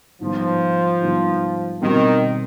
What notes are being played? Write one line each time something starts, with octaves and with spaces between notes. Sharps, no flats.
G#2 D#3 F3 G3 B3
G#2 D#3 G3 B3
B2 D#3 G3 C4 D#4